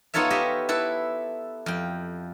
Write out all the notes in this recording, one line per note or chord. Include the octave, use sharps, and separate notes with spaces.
B3 D#4 F4 A4 C#5 E5
G4 D#5 E5
E4 A4 B4
F2 G5